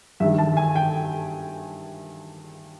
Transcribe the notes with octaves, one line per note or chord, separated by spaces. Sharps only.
G2 D#3 G3 E5
A5
G#5
G5